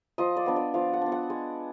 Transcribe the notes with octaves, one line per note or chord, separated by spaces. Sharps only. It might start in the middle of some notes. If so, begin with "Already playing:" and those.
F3 D#5
D5
B3 D4
D5
F3 F5
F#5
B3 D4
F#5
G#3